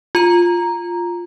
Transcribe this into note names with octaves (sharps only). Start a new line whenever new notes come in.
F4 A#5